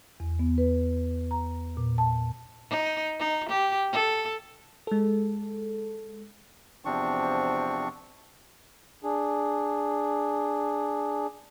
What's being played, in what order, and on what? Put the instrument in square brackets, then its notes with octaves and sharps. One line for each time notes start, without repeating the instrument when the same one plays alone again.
[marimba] E2
B3
B4
A#5
A#2
A5
[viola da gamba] D#4
D#4
G4
A4
[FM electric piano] G#3 A4
[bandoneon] E2 C3 F3 C4 D4 C#6
[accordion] D4 G#4